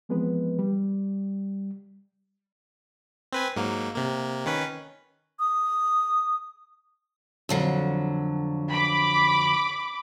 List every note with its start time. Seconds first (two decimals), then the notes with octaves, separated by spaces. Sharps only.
0.09 E3 F3 G#3 B3 C4 B4
0.59 G3
3.33 C4 B4 G#5
3.56 G#2 F#3 A#3
3.95 C3 A#3
4.46 D#3 C#4 B4
5.39 D#6
7.49 F2 D3 F#3
8.69 B5 D6